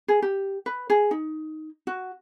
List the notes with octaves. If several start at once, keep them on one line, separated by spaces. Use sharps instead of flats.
G#4
G4
B4
G#4
D#4
F#4